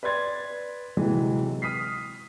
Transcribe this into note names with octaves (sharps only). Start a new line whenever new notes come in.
B4 D5 C6 G#6 A6
C3 E3 F#3 G#3
D#6 F6 B6 C7